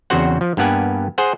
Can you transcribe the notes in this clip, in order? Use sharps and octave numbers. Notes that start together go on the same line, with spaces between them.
E2 C#3 C4 F#4 C5 F#5
F3
G2 A#3 B3 G4 F#5 G#5
G#4 C5 F#5